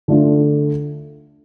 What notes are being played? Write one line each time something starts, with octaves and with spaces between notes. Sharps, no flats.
D3 A3 D4 F4